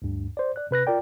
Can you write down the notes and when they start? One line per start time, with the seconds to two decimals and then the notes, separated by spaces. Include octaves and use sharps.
0.02 D2 G2
0.37 C5 D5
0.56 D5 F#6
0.71 C3 B4 F#6 A#6
0.87 F4 A#4 D5 G5